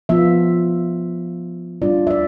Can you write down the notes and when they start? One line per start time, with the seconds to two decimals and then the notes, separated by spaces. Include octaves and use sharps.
0.09 F3 B3 F4 E5
1.82 G3 D4 F4 D5
2.07 E5
2.11 D5